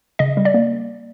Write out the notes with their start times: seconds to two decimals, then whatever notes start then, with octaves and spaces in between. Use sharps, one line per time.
0.19 C#3 D#5
0.37 G3
0.45 D5
0.54 A#3